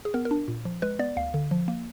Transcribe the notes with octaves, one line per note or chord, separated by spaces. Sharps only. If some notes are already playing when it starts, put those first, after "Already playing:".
G#4
B3 A#4
A#4
D4
A#2
F3
G#3 B4
B3 D5
D2 F5
D3
F3
A#3